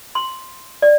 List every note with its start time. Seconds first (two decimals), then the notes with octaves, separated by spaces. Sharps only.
0.15 C6
0.82 D5